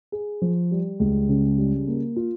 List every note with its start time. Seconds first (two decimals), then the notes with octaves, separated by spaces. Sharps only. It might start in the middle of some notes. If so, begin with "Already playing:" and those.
0.12 G#4
0.42 F3
0.71 G3
1.00 C#2
1.29 C#3
1.58 G3
1.87 A#3
2.16 F4